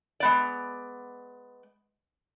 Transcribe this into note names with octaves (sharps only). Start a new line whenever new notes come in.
G#3 B3 D5